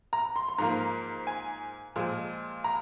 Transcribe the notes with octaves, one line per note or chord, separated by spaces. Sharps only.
A#5
C6
C6
G#2 F3 A#3 A#5
G#5
A#2 F3 G#3
A#5